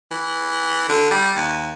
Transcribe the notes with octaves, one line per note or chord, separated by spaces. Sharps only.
E3
D3
G3
D#2